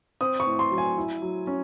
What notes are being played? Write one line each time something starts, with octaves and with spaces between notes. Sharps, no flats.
C4 D#6
C#6
A2
C6
F#3
G#5
E4
F#3
C#4